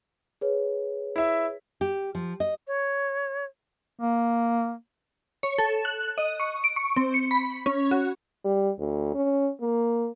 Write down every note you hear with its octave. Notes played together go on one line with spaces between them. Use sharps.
G#4 B4 C#5
E4 E5
G4
F3
D#5
C#5
A#3
C#5
A4
F#6
D#5
C#6
D7
C#6
C4
C#7
B5
C#4
F#4
G3
D2
C#4
A#3